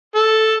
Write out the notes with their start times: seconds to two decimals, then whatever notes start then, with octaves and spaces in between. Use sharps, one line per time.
0.15 A4